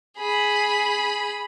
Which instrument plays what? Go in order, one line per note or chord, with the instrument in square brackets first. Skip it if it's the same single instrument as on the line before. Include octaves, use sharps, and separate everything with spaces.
[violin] G#4 B5